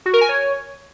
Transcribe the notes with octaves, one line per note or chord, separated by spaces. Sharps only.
F#4
A#4
G#5
C#5